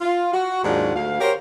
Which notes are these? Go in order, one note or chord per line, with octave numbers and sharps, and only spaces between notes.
F4
F#4
D#2 G#2 F#3 D4 F4 F#5
D2 F5
F#4 G4 A#4 C5 C#5